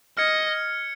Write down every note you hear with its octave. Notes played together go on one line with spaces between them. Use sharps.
D#5 F6 G#6 C#7